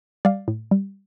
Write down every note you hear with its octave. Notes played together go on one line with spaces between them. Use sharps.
G3 D5 F5
A2
G3